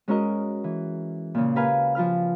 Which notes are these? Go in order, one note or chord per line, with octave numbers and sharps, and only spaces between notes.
G#3 C#4 F#4 A#4 D#5
E3
A#2 C#3
G4 A#4 B4 F5 G#5
F3 F4 B4 F6